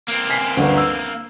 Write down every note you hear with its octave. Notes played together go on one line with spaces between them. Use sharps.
A#3 C4
G#5 B6 C7
G1 D2
E6